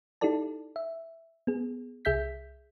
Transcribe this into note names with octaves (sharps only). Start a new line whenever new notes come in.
D#4 E4 G4 A4 D5 A5
E5
B3 G#4
C2 G#4 E5 G6 B6